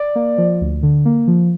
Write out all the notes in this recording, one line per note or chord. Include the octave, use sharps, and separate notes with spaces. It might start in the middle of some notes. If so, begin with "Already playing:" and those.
Already playing: D5
A#3
F3
D2
D3
A#3
F3